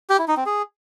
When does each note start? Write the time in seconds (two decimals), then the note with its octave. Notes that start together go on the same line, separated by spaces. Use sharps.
0.10 G4
0.19 E4
0.28 D#4
0.37 C4
0.46 G#4